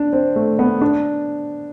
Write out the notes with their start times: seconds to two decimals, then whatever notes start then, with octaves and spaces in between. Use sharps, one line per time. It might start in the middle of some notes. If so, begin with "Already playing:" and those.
Already playing: D4
0.13 C4
0.36 A3
0.59 B3
0.82 D4